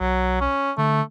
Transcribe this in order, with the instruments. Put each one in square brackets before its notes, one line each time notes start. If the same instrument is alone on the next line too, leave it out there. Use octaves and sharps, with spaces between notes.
[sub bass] B1 [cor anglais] F#3
[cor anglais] C#4
[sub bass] D3 [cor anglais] A3